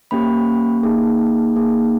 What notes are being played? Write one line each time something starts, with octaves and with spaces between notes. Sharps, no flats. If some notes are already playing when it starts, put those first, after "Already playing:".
A#3 C#4 G4 B5
A#3 D#4 G#4
A#3 D#4 G#4